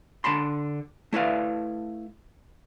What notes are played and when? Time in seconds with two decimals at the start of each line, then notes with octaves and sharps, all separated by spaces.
0.24 D3 A5 B5 C6
1.13 A3 E4 B4 F5